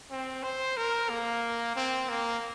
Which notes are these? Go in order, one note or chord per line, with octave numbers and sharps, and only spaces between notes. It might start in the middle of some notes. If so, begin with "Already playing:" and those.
C4
C5
A#4
A#3
C4
A#3